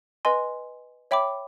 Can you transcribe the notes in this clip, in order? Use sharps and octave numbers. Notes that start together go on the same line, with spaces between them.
B4 D#5 G#5 C6
C#5 E5 G5 B5 D6